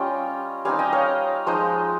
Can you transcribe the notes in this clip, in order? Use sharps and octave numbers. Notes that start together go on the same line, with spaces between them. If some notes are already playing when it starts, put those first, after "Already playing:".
Already playing: G3 C#4 F4 D#5 G5
G3 C4 D#4 F5 G#5
D#5 G5
C#5 F5
F3 G#3 D#4 C5 D#5